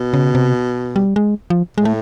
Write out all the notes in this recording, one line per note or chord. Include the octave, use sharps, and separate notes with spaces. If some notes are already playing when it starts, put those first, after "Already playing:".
Already playing: B2
C#3
C3
G3
G#3
F3
A2 G#3
A3